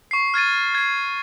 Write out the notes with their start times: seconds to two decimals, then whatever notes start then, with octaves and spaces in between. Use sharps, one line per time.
0.11 C#6 C7
0.34 F6 G#6 A6 D#7
0.75 G#6 C7